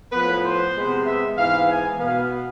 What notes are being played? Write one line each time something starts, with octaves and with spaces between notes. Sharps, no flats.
A2 F3 B3 B4
C5
C3 G#3 B3
E5
G#2 E3 B3 F5
G#5
B2 B3 F5